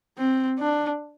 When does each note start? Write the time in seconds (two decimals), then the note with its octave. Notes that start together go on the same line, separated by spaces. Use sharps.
0.18 C4
0.59 D4